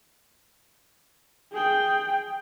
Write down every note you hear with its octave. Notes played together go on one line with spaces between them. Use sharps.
G#4 G5